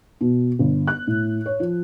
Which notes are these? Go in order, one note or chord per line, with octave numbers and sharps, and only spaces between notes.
B2
G1
F#6
A2
C#5
F3